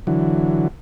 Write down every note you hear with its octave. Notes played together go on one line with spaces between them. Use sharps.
D3 E3 F#3